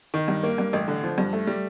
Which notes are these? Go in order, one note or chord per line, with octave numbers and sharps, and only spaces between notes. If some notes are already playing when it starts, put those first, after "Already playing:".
D#3
G2
A#3
G2
A1
D3
F3
G2
A3
G3